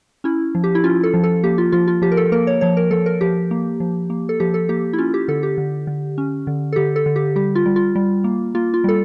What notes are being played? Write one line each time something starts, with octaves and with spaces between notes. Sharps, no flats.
C#4 E4
F3
G4
E4
C#4 F4
A4
F3
A4
A#3 G4
F4
F3 F4
F4
F3 G4
A#4
A4
A#3 A#4
C#5
F3 C#5
A#4
F3 A4
A#4
F3 G4
A#3
F3
A#3
A4
F3 G4
A4
A#3 G4
E4
C#4 F4
G4
D3 A4
G4
D3
D3
C#4
D3
A4
D3 G4
A4
D3
G4
G3 G4
F4
G3
F4
G3
A#3
A#3 F4
F4
G3 A4